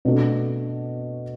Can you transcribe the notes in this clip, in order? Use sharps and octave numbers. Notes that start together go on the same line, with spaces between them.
B2 A3 D4 F#4 A4